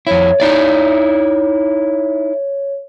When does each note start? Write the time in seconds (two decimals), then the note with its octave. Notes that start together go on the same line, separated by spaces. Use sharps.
0.07 F2 E4 C#5
0.40 D#4 E4 D5